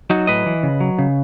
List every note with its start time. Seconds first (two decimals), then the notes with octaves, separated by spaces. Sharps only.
0.10 F#3 D#4 F#4
0.27 A2 B4 D#5
0.46 E3
0.63 C#3
0.80 F#3
0.99 C#3